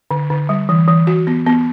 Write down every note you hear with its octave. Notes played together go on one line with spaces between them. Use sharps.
D3
D3
G3
E3
E3
F#4
B3
B3